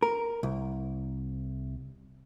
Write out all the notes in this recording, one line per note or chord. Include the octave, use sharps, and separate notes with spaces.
A#4
C2